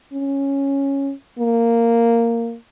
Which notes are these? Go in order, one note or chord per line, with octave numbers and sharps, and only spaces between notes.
C#4
A#3